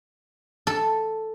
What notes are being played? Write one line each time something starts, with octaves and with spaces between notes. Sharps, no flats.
A4